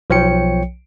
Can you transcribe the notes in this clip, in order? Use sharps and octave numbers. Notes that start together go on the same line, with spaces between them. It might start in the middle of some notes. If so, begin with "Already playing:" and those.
B1 F3 C#5 G5 C#7